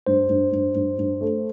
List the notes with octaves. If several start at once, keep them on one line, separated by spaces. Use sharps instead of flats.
G2 C5
G2
G2
G2
G2
A3